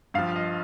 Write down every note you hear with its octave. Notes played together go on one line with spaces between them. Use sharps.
G2 F3 F5
D#5